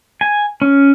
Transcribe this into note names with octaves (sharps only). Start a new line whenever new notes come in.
G#5
C#4